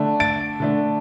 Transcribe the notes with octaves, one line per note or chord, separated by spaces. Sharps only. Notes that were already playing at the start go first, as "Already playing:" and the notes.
Already playing: D3 A3 D4
A6 D7
D3 A3 D4